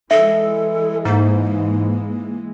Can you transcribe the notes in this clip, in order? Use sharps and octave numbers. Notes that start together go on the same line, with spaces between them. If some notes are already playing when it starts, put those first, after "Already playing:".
E3 G#3 A4 E5
G#2 A#3